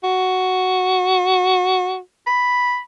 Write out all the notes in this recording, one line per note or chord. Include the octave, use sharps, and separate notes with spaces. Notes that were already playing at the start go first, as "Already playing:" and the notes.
F#4
B5